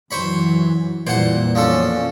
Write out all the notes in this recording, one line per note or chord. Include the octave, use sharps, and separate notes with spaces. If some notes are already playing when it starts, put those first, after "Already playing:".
F#2 E3 F#3 C5 C#5 B5
F2 A#2 E3 G3 C5 F#5
F2 B2 F3 C#4 D4 A4